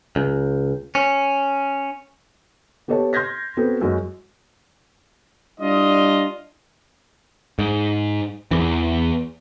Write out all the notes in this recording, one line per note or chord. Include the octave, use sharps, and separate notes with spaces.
C#2
C#4
B3 G4 A4 C#5 A5
C6 F6 G6 G#6 A#6 B6
B3 C4 F#4 A4
F#2 G#3 F#4
G3 D4 E4 F4 D#5
G#2
E2 E3